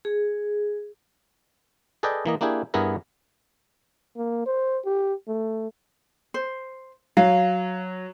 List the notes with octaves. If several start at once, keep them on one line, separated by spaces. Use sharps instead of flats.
G#4
G#4 A4 B4 D5 D#5 G5
E3 A#3 D#5
A#3 D4 E4 G4 G#4
G2 B3 E4 G#4 A#4
A#3
C5
G4
A3
C5
F#3 F5